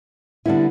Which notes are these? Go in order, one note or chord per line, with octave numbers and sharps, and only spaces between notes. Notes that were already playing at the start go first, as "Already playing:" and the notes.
D3 G3 B3 E4